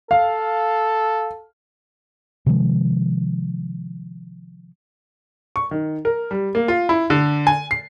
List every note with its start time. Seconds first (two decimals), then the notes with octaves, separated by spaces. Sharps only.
0.11 A4 F5
2.46 C3 D#3 F3 G#3
5.56 C#6
5.71 D#3
6.05 A#4
6.31 G3
6.55 A#3
6.68 F4
6.89 E4
7.10 D3
7.47 G#5
7.71 C7